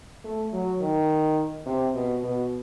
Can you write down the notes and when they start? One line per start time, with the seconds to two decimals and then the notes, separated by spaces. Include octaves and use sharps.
0.24 A3
0.53 F#3
0.81 D#3
1.66 C3
1.94 B2
2.23 B2